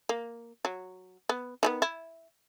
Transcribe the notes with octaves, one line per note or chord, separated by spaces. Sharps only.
A#3
F#3
B3
D#3 G#3 B3
E4